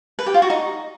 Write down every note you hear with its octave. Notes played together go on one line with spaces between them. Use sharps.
B4
G4
F4
F#4
D#4